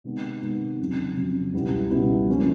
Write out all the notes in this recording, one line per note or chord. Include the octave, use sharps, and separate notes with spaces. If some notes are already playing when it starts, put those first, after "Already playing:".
C3 D#3 G#3 B3
C3 D#3 G#3 B3
F2 C#3 F#3
F2 C#3 F#3
C#2 B2 G3 B3 E4
C#2 B2 G3 B3 E4
F3 A#3 C#4 E4